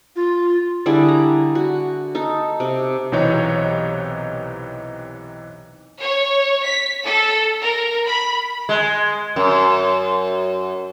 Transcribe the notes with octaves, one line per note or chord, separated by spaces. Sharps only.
F4
D3 G3 E4 G#4
A#5
F#4
D#4 A4
C3
B1 C3 E3 D#4 C#5
C#5
B6
A4
A#4
B5
G#3
F#2